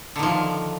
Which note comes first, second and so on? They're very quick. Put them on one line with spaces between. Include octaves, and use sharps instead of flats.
D3 D#3 F3